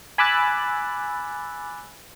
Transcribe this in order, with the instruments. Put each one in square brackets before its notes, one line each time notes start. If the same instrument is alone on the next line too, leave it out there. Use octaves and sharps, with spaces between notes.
[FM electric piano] G#5 B5 D6 E6 F#6 A6